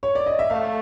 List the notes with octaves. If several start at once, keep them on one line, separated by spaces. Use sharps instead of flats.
C#5
D5
D#5
E5
A3 F5